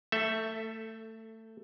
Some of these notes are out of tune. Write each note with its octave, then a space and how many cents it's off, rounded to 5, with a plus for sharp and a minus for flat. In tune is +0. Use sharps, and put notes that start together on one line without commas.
A3 +20 A4 +0 E5 +0